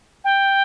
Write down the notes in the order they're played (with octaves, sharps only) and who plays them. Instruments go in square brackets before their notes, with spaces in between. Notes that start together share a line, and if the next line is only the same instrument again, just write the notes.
[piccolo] G5